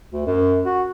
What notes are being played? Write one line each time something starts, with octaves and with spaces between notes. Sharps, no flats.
D2
F#2
F#4